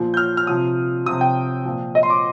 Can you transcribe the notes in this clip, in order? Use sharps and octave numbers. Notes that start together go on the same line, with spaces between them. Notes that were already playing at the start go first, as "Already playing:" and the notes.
Already playing: A#2 F3
G6
F6
F6
C3 F3 D#6
C3 F3 D#6
G5
A#2 F3
D#5
C6
D6